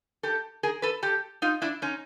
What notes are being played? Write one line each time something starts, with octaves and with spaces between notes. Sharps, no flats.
G4 A4
G#4 A#4
A4 B4
G4 A4
D#4 F4
D4 E4
C#4 D#4